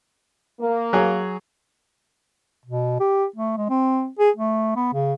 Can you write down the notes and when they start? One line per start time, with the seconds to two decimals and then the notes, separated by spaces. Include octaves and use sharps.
0.61 A#3
0.93 F#3 G#4
2.65 B2
3.00 G4
3.36 A3
3.57 G#3
3.70 C4
4.19 G#4
4.37 A3
4.76 B3
4.93 C#3